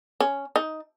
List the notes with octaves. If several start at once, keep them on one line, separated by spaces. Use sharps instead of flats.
C#4
D#4